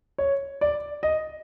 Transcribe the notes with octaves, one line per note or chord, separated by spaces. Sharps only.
C#5
D5
D#5